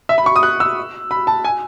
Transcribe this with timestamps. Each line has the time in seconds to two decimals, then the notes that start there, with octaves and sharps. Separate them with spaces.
0.09 E5
0.18 B5
0.26 C#6
0.36 D#6
0.43 F#6
0.60 E6
1.11 B5
1.27 A5
1.45 G#5